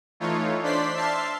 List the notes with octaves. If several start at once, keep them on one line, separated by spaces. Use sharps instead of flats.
E3 A3 D#4 F4 C#5
D4 C5 D5 C6 B6 C7
E5 A5 C6 F6 C7